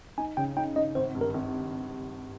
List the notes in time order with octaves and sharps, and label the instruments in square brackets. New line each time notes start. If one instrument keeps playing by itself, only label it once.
[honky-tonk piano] D#4 [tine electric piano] G#5
[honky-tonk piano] C#3 [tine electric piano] G5
[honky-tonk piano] D#4 [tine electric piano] G5
[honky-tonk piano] D#4 [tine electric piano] D#5
[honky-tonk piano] G#1 [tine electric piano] C5
[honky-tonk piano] G2
[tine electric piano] A#4
[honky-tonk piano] G#1